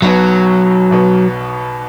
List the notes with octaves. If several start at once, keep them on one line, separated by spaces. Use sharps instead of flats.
B1 B2 F#3 B3
B1 B2 B3